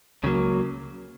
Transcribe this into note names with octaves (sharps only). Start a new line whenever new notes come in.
C#2 C#3 F#3 A#3